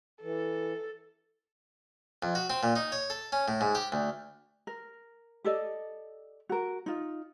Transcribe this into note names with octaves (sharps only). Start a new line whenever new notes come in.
E3 A4
F2
F#4
C4
A#2
D#4
C#5
A4
C#4
A2
G#2
G4
D2
A#4
G4 A4 D5 D#5
F#4 A#4
D#4 F4